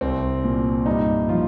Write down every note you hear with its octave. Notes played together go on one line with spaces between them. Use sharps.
C2 C4
A#2
G2 D#4
F3 F4